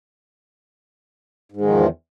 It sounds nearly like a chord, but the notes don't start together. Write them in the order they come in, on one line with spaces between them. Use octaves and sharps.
G#2 G#3 D#3 F3 E2